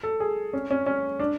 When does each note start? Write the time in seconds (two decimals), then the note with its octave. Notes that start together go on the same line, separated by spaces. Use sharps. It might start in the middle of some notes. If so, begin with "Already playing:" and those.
0.03 A4
0.20 G#4
0.53 C#4
0.71 C#4
0.86 C#4
1.19 D4